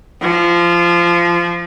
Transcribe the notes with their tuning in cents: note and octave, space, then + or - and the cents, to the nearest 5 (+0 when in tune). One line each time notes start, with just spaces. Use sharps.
F3 -20